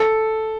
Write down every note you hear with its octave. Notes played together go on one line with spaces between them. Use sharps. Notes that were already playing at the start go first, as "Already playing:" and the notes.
Already playing: A4